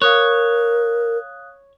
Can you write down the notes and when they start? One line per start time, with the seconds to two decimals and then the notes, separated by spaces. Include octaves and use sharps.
0.02 A#4 C#5 F5 D#6 F#6